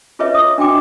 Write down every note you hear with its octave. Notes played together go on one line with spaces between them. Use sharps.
F4 G#4 B4 C#5 D#5 E5
D#6
D4 F#4 G5 D6